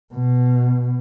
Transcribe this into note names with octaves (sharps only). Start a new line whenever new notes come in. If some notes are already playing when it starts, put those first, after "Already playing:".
B2